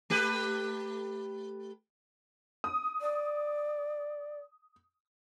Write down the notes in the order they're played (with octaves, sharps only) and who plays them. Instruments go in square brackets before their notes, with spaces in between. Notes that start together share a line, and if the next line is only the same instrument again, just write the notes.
[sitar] A3 G4 B4
[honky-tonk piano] D#6
[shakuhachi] D5